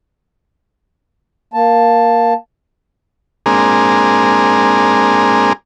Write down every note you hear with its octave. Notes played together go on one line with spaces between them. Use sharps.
A#3 A5
G#3 A#3 C4 D4 G#4 A#4